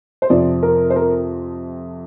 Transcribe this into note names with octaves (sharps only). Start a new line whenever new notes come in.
C5
F2 C3 F3 C4 D5
A#4
C5
A#4